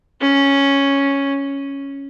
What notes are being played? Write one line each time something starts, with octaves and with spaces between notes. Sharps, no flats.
C#4